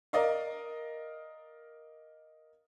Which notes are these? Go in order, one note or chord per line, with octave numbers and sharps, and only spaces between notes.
A#4 D5 D#5 F5